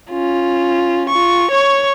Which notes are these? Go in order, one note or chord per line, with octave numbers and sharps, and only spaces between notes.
C#4 F4
F4 C#6
C#5 C#6